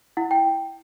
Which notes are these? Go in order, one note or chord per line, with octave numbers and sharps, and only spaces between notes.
E4 F#5
G5